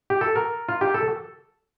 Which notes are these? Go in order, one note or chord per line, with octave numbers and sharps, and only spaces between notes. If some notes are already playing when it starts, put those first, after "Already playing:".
G4
A4
A#4
F4
G4
A4